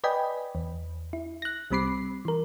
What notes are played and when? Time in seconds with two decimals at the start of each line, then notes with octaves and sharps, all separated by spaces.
0.04 B4 D5 D#5 G5 G#5 B5
0.55 E2
1.13 E4
1.42 F#6 A#6
1.71 C2 G3 C4 B5 D6 C7
2.25 E3 A#4